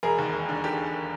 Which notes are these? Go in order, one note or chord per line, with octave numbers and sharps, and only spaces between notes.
E1 G#4 A#4
D#2
E1
D3
G4 A4